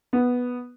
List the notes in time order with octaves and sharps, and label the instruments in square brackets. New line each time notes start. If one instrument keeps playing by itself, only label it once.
[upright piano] B3